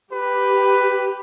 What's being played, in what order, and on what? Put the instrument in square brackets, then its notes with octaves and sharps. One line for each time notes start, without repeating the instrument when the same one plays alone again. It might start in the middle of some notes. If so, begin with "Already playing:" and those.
[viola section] G4 [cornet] B4